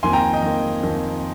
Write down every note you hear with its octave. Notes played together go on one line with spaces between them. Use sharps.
F2 D#3 A#3 G#5 C6
G5 A#5
D#5 G5
F2 D#3 A#3
F2 D#3 A#3